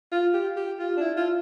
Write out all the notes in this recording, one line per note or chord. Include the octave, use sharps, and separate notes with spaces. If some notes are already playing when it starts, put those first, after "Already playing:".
F4
G4
G4
F4
D4
E4
F4